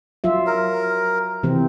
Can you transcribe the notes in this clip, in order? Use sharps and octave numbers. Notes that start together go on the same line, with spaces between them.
F#3 F4 E5
A#4
C3 E3 C4